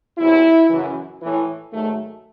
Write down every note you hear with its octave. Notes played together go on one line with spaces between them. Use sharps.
E2 C3 F#3 E4
F#2 C#3 E3
A2 E3
G#2 D#3 F#3 A3